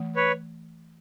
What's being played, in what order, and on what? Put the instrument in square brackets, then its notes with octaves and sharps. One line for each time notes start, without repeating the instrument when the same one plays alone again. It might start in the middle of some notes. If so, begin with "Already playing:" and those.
Already playing: [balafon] E3 A3
[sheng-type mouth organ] B4 C#5